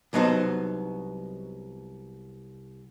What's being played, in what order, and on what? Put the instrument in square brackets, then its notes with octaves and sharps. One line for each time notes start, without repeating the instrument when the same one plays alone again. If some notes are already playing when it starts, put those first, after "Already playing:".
[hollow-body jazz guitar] C2 F#3 B3 D#4 C5 A5